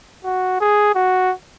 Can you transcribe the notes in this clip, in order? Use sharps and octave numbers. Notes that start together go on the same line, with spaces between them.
F#4
G#4
F#4